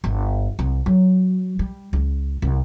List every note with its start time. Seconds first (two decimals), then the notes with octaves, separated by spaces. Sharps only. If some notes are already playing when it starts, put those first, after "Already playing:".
0.04 G1
0.59 C2
0.86 F#3
1.59 G3
1.93 C#2
2.42 C2